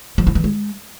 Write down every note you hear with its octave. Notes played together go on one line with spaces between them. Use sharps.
F3
E4
E3
G#3